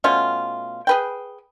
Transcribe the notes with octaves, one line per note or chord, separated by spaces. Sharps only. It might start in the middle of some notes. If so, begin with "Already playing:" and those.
B2 A3 C#4 F4
G#4 B4 G5